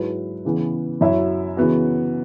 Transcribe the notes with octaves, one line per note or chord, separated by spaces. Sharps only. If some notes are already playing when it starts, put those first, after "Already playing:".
Already playing: G#2 F#3 E4 G#4 B4
C#3 E3 B3 G#4
F#2 F#3 E4 C#5 E5
C#3 E3 B3 F#4